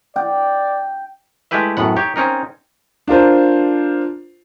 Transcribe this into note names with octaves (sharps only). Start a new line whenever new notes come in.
D5 G5
G#3 A3 E4 G4 B4 E5
F#2 A2 B3 F#5
D#4 G4 C#5
C4 C#4 D#4 A#4
D4 F4 A#4 C5